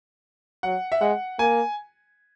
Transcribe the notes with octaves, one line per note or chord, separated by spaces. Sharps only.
F#3 F#5
E5
G#3 F#5
A#3 G#5